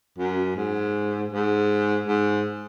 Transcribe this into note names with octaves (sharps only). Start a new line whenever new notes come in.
F#2
G#2
G#2
G#2